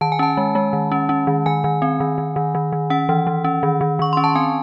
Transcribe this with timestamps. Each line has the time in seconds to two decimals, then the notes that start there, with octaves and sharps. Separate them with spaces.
0.01 D#3 A5
0.12 G#5
0.19 C#4 A5
0.37 G#3
0.55 G#3
0.73 D#3
0.92 C#4
1.09 C#4
1.27 D#3
1.46 D#3 G#5
1.64 D#3
1.82 C4
2.00 D#3
2.18 D#3
2.36 D#3
2.55 D#3
2.73 D#3
2.90 C#4 F#5
3.09 E3
3.27 E3
3.44 C#4
3.63 D#3
3.81 D#3
3.99 D#3 C#6
4.13 C#4 C6
4.24 A5
4.35 C4 G#5